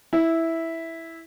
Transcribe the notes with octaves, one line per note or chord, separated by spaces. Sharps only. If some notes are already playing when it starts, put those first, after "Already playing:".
E4